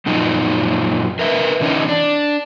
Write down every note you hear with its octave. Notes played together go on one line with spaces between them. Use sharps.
F#2 A#2 F3 D#4
A#4 B4 E5
D3 E3 C#4 D#4
D4